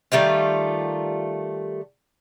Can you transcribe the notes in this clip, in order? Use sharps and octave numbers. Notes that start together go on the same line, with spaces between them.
D#3 G3 A3 F4